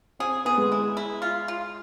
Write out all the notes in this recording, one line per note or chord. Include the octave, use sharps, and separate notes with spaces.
C4 G#4
B3 G#4
G#3
E4
E4
F4
F4